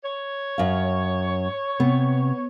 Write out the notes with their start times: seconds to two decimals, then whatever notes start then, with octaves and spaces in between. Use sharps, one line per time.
0.03 C#5
0.58 F#2 F5
1.80 C3 B3